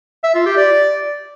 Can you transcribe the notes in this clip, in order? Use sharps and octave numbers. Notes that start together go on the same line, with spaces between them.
E5
F4
G4
D5